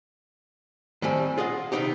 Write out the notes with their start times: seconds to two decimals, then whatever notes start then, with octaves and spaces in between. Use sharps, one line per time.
1.02 A2 D#3 G3 C4 G#5
1.38 F4 G#4 D#5 F5 F#5
1.72 C3 D#3 B3 C4 D#4 G4